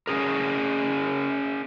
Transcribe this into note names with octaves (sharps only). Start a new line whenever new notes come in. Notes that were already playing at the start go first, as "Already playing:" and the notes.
C#4 G#4 A#4